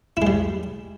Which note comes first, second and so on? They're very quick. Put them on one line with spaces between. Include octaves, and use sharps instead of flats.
E4 G#3 G3